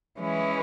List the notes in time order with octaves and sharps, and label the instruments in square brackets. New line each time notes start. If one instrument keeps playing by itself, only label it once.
[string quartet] E3 G#3 C#4 E4